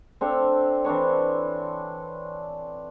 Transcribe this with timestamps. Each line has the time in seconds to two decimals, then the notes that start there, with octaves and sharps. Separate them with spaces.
0.21 C4 D4 A4 F5
0.84 E3 C4 D4 C#5